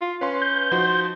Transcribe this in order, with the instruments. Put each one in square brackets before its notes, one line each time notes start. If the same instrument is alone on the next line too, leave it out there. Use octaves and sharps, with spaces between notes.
[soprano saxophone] F4
[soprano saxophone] C#4 [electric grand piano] B4 F5 C6
[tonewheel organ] G6
[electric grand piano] F3 D#4 F#4 [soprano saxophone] C5